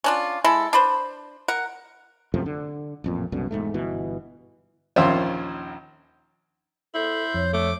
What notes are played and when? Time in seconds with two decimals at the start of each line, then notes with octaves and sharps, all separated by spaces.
0.04 C#4 D4 F4
0.44 G#3 E4 A4
0.73 D4 B4 C5
1.48 A#4 F#5
2.34 F#2 C3 F3 A3
2.46 D3
3.04 A1 F2 A#2
3.32 C2 F#2 B2 D3
3.51 E1 C#2 G#2 A3
3.74 G1 B2 E3
4.96 A#1 D#2 C#4 F4 C5 E5
6.95 E4 A4 C5
7.34 F2 C#5
7.53 A3 D6